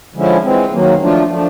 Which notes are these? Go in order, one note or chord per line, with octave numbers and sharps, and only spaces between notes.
D3 F3 G#3 C#4 E4
E3 G#3 C4
D#3 F#3 A#3
F3 A3 D4 F4
F3 A3 D4